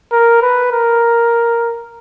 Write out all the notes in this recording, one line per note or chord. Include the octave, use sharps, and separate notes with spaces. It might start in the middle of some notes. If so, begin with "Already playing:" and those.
A#4
B4
A#4